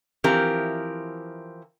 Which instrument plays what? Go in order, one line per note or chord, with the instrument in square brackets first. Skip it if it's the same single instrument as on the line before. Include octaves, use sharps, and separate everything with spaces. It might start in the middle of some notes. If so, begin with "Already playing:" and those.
[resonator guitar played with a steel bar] E3 F3 C4 G4 A#4